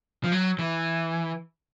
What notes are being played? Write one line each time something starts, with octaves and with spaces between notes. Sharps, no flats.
F3
F#3
E3